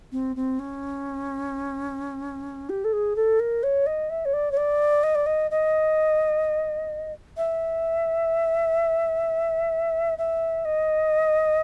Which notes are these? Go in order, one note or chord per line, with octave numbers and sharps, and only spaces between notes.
C4
C4
C#4
G4
A4
G#4
A4
A#4
C#5
D#5
E5
C#5
D5
C#5
D5
D#5
D5
D#5
D#5
E5
E5
D#5